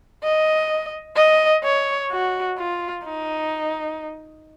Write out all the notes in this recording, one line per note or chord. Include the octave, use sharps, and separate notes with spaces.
D#5
D#5
C#5
F#4
F4
D#4